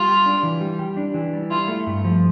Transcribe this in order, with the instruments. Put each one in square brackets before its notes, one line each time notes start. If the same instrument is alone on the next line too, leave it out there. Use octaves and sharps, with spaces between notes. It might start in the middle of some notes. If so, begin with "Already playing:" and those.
Already playing: [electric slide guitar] G3 [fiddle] F4
[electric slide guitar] G4
D4
E3
G3
G4
D4
E3
G3
[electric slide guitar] E4 [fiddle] F4
[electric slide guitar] A3
G2
F3